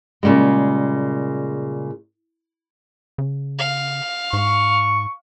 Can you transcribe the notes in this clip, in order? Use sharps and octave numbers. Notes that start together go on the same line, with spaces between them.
A#2 C#3 E3 G3 G#3
C#3
F5
G#2 C#6